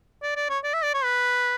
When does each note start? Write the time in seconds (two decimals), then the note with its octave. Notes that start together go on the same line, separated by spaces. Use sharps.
0.22 D5
0.36 D5
0.49 C#5
0.64 D5
0.74 E5
0.83 D5
0.94 C#5
1.04 B4